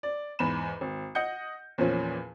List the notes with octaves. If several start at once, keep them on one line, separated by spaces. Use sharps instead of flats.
D5
E2 G#2 B5 E7
G#1
D#5 F#5 G6 C#7
E2 A#2 F3 C#4